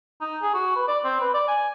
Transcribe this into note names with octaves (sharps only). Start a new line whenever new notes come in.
D#4
G#4
F#4
B4
D5
C4
B4
D5
G#5